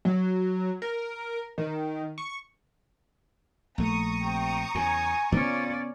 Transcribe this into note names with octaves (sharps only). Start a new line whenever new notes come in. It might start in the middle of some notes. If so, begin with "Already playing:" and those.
F#3
A#4
D#3
C#6
A#1 A3 A#5 C#6 D#6
C3 G5
E2 C#3 G#5
C#3 B3 C#4 F4 C5 D5